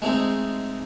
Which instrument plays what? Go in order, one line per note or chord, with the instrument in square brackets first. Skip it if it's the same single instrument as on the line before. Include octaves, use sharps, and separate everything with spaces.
[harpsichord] G#3 A3 C4 D#4